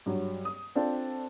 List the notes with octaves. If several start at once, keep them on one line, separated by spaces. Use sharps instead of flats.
G2 F#3
D#6
C4 D4 F4 A4